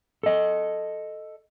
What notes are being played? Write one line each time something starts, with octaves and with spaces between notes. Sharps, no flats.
A4 D#5